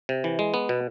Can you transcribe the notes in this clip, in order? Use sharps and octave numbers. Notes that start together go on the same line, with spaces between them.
C3
E3
G#3
B3
B2